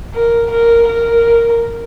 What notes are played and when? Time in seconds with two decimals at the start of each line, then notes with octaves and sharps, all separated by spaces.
0.15 A#4
0.51 A#4
0.88 A#4